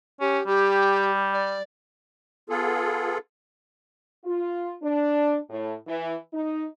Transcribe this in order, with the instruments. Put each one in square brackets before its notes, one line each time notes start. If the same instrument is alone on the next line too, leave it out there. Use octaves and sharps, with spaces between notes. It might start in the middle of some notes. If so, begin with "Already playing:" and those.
[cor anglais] C#4 [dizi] G4
[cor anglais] G3 [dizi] G4
[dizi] D5
[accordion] B3 F4 G#4 A4
[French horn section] F4
D4
A2
E3
D#4